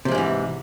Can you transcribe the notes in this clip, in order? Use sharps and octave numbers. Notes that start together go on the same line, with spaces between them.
G#2 C3 E3 F3 G#3